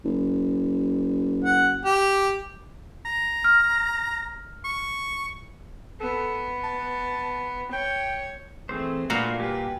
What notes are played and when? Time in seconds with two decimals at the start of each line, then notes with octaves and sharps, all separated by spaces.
0.05 F#1
1.44 F#5
1.84 G4
3.05 A#5
3.44 F6
4.64 C#6
6.00 B3 A4
6.64 A5
7.73 C#5 G5
8.69 E3 A3 C4 G#4 C5
9.10 A#2 A3 A#3 D4 F4 F#4 B4 F5
9.39 G3 G4 B4 G#5